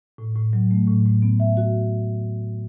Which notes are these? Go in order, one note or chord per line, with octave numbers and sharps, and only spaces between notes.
A2
A2
F#3
A3
A2
A2
B3
E5
F#4